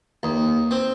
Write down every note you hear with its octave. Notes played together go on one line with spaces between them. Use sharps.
D#2
C4